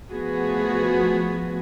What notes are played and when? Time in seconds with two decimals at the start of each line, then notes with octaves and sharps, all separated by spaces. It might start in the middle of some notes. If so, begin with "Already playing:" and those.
0.11 F3 A3 B3 F#4 G#4